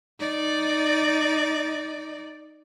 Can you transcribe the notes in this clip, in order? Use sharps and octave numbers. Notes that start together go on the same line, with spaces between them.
D#4 D5